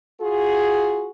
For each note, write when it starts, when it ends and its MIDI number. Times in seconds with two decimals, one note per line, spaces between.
0.21 1.10 65
0.21 1.10 66
0.21 1.10 68